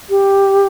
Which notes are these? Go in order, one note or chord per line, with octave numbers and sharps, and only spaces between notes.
G4